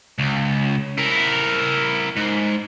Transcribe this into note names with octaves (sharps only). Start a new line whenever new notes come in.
C#2
E4 A#4
G#2